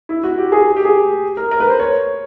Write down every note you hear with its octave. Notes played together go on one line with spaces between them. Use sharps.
E4
F#4
G4
G#4
G4
G#4
A#4
A#4
B4
C5
C#5